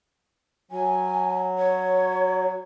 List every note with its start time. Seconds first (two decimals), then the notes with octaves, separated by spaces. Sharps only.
0.71 F#3 G#5
1.58 C#5